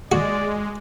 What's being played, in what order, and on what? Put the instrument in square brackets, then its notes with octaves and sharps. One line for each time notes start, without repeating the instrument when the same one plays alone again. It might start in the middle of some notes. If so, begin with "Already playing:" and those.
[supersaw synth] G#3 [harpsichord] F#4 [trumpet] D5